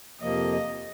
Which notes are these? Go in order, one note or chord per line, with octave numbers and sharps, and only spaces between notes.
F2 C3 F3 A#3 D#5